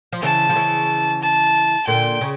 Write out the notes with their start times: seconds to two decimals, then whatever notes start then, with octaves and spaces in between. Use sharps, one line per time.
0.12 F3
0.22 C#3 E3 A5
0.49 F3
0.55 C#3 E3
1.22 A5
1.87 A#2 D3 G5
2.21 C#3